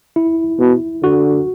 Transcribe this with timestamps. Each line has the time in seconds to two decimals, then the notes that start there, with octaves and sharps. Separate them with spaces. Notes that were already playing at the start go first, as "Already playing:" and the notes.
0.16 E4
0.59 B2
1.03 D3 F#4